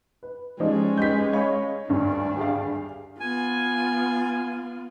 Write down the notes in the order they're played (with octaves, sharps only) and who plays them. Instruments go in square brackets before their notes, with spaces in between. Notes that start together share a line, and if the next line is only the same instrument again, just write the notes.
[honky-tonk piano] B4
[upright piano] F3 G3 [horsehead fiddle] G#3 C#4 [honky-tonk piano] D#4 D5
[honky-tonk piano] D#4 G4 B4 [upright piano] G6 B6
[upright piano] C#5 D#5 B5 [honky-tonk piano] F5 C#6
[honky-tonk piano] G#1 D2 G2 [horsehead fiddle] D4
[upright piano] G4 G#4 F5
[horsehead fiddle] B3 F4 [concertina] G#5